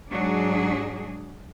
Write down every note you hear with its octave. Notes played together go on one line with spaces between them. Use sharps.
G#2 F#3 D4 G#4